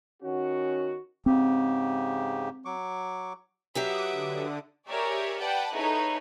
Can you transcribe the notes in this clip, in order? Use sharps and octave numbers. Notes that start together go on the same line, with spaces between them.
D#3 C#4 F#4
G#2 C#3 C4 G4
F#3 C#6 D6
F#3 G4 B4 E5 F#5 D6 D#6
D3
G4 G#4 A#4 C#5 D5 E5
B4 D5 F#5 G5 A5
D#4 E4 G#4 A4 B4 C#5